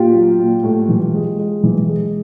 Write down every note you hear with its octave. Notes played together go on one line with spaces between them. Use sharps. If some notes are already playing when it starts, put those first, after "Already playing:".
Already playing: A#2 F4 G4
F#3
A#2
A2
E3
G#3
G#3
E3
G#3